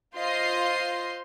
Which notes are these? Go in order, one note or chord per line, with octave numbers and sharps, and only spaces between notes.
F4 C5 D#5 F5 C6 C7